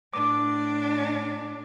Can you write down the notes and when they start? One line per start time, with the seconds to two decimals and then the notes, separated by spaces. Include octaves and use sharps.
0.14 A2 D4 D6